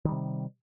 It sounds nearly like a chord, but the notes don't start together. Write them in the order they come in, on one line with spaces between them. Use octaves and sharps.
D#3 G3 C3